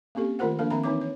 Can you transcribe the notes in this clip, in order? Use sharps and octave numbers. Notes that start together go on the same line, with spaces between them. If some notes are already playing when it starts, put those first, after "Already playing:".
A#3 C4 C#4 G4 A4
D#3 A3 F4 A#4 C5 F#5
F3 A#3 D4 A4 F5
D#3 C4 E5 A#5 B5
E3 C4 D#4 C#5 E5 D6
C#5